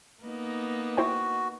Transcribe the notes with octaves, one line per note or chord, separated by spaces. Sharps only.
A#3 B3 D#4
E4 F#4 C5 G5